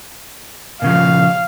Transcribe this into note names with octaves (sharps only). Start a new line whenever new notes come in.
A#2 C#3 F3 F5